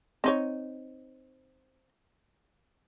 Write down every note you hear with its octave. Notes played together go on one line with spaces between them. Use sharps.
C4 D#4 C#5